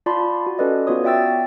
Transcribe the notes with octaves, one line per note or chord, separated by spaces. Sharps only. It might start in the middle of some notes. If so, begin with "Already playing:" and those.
F4 D5 A5 B5 C6
F#4
C#4 A4 B4 D5 D#5
B3 F4 F#4 C#5 D#6
D5 E5 G5 E6 A6